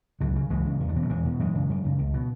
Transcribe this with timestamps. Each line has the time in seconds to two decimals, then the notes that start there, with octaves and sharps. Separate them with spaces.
0.20 C#2 D3 F#3
0.35 C#3
0.50 C#2 E3 G#3
0.66 C#3
0.80 E2
0.89 D3
0.95 B2 E3
1.03 F#3
1.10 E2 E3 G#3
1.25 B2
1.39 F#2 E3 G#3
1.55 C#3
1.69 F#2
1.85 C#3
1.99 C#2
2.14 B2